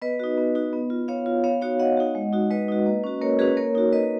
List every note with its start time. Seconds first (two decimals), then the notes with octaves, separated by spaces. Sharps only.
0.02 B3 B4 D#5
0.20 D#4 F#4
0.38 B3
0.55 D#4 F#4
0.73 B3
0.90 F4
1.08 B3 C#5 F5
1.26 F4
1.44 B3 C#5 F5
1.61 D#4 F#4 C#5 F5
1.80 B3 D#5 F#5
1.97 D#4 F#4
2.15 G#3
2.33 D#4 F#4
2.50 G#3 B4 D#5
2.68 D#4 F#4
2.86 A#3
3.04 C#4 F#4
3.21 A#3 A#4 C#5
3.39 C#4 F#4 G#4 B4
3.57 A#3 A#4 C#5
3.75 D#4 F#4
3.92 A#3 B4 D#5